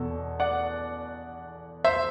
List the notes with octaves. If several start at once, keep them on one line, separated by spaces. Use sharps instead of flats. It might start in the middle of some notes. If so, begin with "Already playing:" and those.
Already playing: E2 B2 A4
D5 F#5
C5 E5